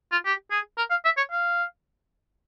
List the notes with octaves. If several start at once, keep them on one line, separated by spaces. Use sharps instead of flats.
F4
G4
G#4
A#4
F5
E5
C#5
F5